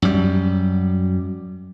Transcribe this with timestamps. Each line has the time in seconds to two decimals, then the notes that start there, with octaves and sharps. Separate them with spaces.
0.02 F#2 G3